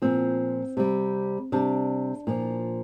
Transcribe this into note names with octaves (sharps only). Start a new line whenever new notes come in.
A#2 F3 C4
C3 G3
C3 G3 D4
A#2 F3